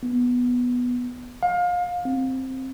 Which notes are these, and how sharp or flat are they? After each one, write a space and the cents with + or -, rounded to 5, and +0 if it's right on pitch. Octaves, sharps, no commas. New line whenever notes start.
B3 -5
F5 +30
C4 +5